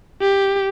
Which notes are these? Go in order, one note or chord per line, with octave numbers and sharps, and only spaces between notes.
G4